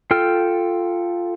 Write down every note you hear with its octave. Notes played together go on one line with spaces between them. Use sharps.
F4 A4 G5 F6